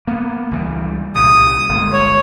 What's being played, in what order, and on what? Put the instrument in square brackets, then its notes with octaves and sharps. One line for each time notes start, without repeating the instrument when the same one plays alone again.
[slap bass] A#3 B3
C#2 E3 G3
[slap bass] C2 A#2 C#3 [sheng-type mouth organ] D#6
[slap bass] G1 G#3 A#3
[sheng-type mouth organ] C#5